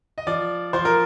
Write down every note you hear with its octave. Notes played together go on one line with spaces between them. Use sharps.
D#5
F3 D5
F3 C5
A#4